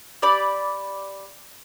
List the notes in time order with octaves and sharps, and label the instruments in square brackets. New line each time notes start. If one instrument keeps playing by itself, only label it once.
[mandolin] G4 D5 B5 D6